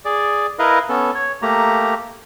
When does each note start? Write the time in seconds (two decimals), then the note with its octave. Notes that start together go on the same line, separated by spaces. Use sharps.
0.05 G#4 D5
0.59 E4 A#4 B4 D#5 F5
0.89 B3 C#4 A4
1.15 C#5
1.42 A3 A#3 G4 A#5